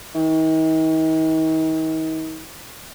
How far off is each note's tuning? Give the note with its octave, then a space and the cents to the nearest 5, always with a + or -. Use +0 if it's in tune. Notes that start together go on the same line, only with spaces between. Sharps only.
D#3 +40